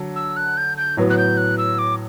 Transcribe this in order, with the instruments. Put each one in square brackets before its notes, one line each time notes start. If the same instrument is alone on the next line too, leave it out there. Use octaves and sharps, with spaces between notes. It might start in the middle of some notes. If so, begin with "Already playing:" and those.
Already playing: [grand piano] D3 F#3 A4
[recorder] E6
F#6
G6
G6
[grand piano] A2 F#3 B3
[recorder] F#6
G6
F#6
E6
D6